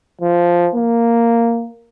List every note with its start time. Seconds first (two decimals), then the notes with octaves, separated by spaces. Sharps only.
0.21 F3
0.75 A#3